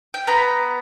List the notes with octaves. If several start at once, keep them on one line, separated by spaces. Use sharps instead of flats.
G5
B3 A#5 B5